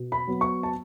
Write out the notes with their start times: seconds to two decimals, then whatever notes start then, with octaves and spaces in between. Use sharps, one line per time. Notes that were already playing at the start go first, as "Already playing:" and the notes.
Already playing: B2
0.12 B5
0.27 F#3 B3
0.41 C#6
0.63 A5